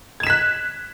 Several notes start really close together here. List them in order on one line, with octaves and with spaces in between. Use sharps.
G#6 E7 B6 F#6